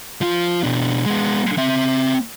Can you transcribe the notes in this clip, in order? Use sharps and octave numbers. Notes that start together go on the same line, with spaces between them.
F3 F4
B2 D4
G#3 B3
C4 E5